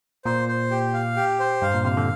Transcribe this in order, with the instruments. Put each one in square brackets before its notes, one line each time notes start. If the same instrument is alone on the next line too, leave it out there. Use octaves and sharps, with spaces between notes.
[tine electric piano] A#2 [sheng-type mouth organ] C5
[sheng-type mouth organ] C5
G4
F5
G4
C5
[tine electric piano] G2 [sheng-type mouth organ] F5
[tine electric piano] A#2
[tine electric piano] C3 [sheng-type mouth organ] F5
[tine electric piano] D3